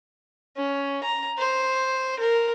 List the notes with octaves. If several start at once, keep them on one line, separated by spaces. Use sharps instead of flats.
C#4
A#5
C5
A#4